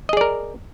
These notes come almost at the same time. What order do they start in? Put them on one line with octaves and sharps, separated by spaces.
D#5 G#4 D5 A#4